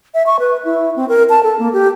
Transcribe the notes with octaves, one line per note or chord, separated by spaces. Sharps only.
E5
C#6
B4
E4
C4
A#4
A5
A4
A#3
G4